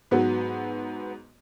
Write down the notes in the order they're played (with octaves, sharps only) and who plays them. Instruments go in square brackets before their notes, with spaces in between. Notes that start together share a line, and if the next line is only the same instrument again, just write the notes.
[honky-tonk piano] G#2 F#3 B3